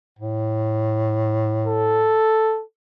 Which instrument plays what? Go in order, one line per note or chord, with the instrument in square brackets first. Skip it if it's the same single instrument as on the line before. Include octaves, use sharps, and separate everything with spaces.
[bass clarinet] A2
[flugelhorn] A4